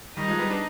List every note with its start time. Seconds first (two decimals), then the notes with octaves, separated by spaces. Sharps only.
0.16 D#3 G3 D#4
0.28 F3 G#3
0.39 G3 B3
0.50 B3 D4